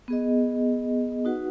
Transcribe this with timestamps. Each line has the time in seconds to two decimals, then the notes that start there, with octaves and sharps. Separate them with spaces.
0.08 B3 G#4 D#5
1.25 D#4 F#4 B4 F#5